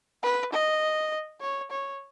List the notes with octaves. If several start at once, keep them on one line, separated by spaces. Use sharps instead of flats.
B4
D#5
C#5
C#5